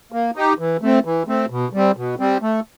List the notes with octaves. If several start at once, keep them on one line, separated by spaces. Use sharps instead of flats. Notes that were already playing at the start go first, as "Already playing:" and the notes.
A#3
D#4 G4
E3
A3 C4
E3
A3 C4
B2
G3 C4
B2
G3 C4
A3